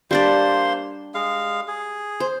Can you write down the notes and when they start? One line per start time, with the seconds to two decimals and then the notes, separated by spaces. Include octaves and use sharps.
0.11 G3 A#3 D4 C5 D5 C6
1.14 G#3 F5
1.68 G#4
2.20 C5